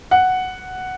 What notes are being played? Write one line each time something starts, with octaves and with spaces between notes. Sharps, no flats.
F#5